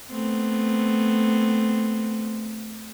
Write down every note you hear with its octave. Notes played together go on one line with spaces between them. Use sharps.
A3 B3 C4